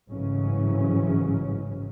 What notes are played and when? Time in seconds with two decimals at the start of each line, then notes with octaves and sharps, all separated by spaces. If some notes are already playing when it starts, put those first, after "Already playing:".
0.11 A1 G#2 C#3 E3 F#3 C#4